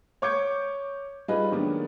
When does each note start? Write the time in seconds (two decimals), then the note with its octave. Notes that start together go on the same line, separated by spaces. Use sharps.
0.22 C#5 C#6 D6 G6 G#6 C#7
1.28 G3 D#4 F4 G#4 B4 D#5
1.52 D#3 F#3 G#3 A#3 B3 D4